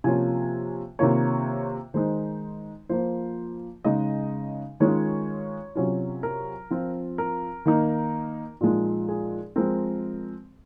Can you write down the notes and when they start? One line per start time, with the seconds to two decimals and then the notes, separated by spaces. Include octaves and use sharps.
0.04 C3 F3 A#3 C#4 F4 G#5
0.99 C3 D#3 A#3 F4 C#5
1.94 D#3 G#3 D#4 C5
2.89 F3 A#3 F4 C5
3.84 C#3 G#3 D#4 D#5
4.80 D#3 G#3 C#4 F4 C#5
5.75 C3 F#3 C#4 F4
6.23 A#4
6.70 F3 C4 F4
7.18 A#4
7.65 D#3 A#3 D#4
8.61 A#2 F3 G#3 D#4
9.09 G#4
9.56 F3 G#3 C4 A#4